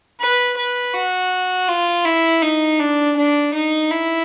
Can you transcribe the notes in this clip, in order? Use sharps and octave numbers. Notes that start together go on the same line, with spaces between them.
B4
B4
F#4
F4
E4
D#4
D4
D4
D#4
E4